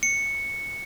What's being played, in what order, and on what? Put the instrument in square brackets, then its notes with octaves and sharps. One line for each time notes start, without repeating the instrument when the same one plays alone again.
[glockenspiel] C#7